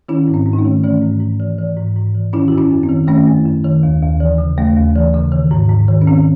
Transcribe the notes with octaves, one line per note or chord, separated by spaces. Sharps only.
D#3 C#4 E4
G#2
C4
G#2
D#4
A3 C#4
D#3
E3 A3 C#4
G#2
G#2
E3
E3
G#2
G#2
E3
D#3 C#4 E4
F#2 F#4
C#4 E4
F#2
C4
D#3
D#3 A3 C#4
F#2
F#2
D#3
D#2
D#2
E3
C#3
D#2 A3
D#2
E3
C#3
D#3
G#2
G#2
D#3
C#4
D#3 C4